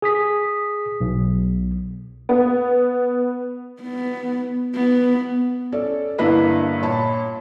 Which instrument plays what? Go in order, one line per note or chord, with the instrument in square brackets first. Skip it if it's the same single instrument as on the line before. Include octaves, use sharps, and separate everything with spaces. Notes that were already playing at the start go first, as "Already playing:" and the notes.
[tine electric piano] G#4 D#6 B6
B1
[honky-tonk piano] B3
[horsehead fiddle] B3
B3
[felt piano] C#4 A4 D5
G2 D3 A#3 E4 B4 D#5
A#2 C#5 A5 B5